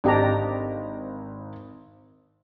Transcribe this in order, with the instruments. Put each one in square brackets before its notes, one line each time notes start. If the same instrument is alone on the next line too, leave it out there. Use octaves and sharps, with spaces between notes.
[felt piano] G#1 C4 D#5 [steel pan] D4 G4 A#5